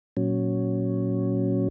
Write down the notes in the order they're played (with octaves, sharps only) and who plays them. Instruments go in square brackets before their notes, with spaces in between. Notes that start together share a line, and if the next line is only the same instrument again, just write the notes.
[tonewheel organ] A#2 F#3 C#4